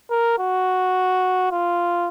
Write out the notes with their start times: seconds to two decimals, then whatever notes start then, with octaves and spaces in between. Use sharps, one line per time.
0.11 A#4
0.39 F#4
1.51 F4